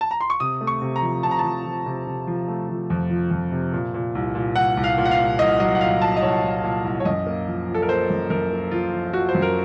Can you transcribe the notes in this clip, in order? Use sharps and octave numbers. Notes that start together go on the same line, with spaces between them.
A5
A#5
C6
C#6
C3 D#6
A3
C#6
C3
A#5
F3
C3 A5
A#5
F3 A5
F3
C3
C3
F3
A3
F3
F2
F3
F2
C3
A#2
A#2
C2
A#2
C2 F#5
C2
F5
A#2
F#5
F5
C2
C2 D#5
F#3 D#5
F#5
A#2 F5
F#3 A5
D#5
C2 C#5
C2
A#2
C2
C#5
F#2 D#5
A#3
F3
F3
A4
A#4
A#3 C5
F#2
F#2 A#4
A#3
F3 F4
F3
F3 F#4
C5
F#2
A#4